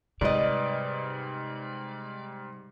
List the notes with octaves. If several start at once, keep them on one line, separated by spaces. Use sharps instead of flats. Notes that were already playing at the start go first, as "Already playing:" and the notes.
G#2 C3 G3 B4 D5 D#5